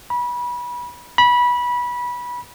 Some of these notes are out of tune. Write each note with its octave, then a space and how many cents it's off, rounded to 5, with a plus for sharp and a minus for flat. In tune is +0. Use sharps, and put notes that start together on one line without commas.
B5 -25
B5 -20